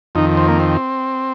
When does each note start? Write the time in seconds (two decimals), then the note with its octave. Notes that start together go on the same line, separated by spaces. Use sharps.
0.15 F2 D#3 D#4
0.37 C4
0.48 A#3
0.60 C4